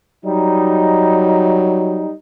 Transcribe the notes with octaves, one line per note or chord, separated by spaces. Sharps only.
F#3 G3 D#4